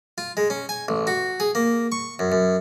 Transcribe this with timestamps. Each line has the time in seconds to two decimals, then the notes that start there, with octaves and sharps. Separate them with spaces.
0.18 F4
0.37 G#3
0.50 C#4
0.69 G#5
0.88 A1
1.07 F#4
1.40 G#4
1.55 A#3
1.92 C#6
2.19 F#2
2.32 F#2